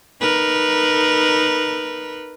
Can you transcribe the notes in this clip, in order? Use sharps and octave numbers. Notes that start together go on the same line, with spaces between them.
D#4 A#4 B4